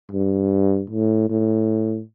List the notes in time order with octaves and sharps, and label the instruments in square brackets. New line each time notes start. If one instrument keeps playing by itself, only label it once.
[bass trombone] G2
A2
A2